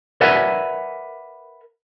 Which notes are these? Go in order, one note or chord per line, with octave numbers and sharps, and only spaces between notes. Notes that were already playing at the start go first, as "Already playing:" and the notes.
A#4 B4 D5 E5 F#5 G#5